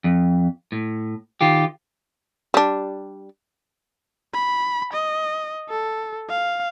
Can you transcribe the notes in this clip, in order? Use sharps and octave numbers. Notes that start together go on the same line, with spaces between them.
F2
A2
D#3 F4 G4
G3 D4
B5
D#5
A4
F5